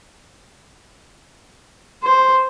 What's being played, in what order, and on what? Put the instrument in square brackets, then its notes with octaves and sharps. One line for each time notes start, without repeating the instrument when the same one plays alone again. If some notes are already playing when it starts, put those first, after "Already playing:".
[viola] C5